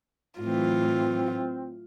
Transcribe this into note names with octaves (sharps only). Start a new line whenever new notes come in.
A2 E3 F#3 C4 F4